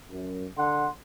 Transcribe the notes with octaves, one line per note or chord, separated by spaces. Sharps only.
F#2
D3 F#5 C6